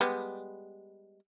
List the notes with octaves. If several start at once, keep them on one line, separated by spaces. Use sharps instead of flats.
G3 G#3 B3